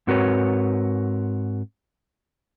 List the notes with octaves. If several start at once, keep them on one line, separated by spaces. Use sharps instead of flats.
G#2 C4 F#4 A#4 B4 C#5